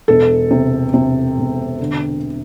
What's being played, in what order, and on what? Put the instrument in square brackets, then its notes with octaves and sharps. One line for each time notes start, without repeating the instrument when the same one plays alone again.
[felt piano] E1 A4
C3
C3
E1
D3